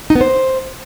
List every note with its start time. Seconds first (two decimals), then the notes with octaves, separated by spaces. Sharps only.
0.10 D#4
0.15 B3
0.21 C5